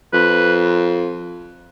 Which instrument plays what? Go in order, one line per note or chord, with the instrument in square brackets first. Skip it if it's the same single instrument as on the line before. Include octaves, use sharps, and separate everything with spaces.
[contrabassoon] F2 [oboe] B4